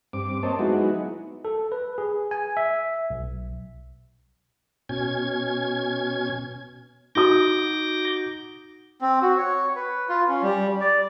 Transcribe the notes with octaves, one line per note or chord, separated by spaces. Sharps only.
G2 C4 D6
A#3 C4 C5 C#5 D#5 A5
F#3 G#3 B3 D#4 E4 F#4
A4
B4
G#4
G#5
E5
B1
B2 C#4 G#6
D#4 F#4 D6 D#6 G6 A#6
C4
F#4
C#5
B4
F4
C#4
G3
D5